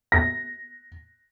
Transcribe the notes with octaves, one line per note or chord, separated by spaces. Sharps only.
A#6